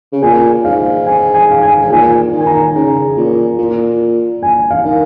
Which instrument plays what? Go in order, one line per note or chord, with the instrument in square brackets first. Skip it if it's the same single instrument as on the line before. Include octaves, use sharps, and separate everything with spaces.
[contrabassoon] C#3
[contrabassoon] A#2 [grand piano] G#5
[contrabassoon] G#2 [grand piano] F5
[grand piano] G#5
G#5
F5
G#5
[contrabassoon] G#2
[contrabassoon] A#2 [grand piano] G#5
[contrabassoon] D#3
[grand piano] G#5
A#5
[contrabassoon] C#3
A#2
A#2
[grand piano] G#5
F5
[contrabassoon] D#3